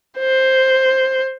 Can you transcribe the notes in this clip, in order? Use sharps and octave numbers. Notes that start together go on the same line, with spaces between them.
C5